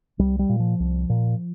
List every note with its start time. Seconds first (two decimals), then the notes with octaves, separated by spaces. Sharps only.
0.19 C2 G3
0.39 G3
0.49 A#2
0.60 F3
0.80 C2
1.10 A#2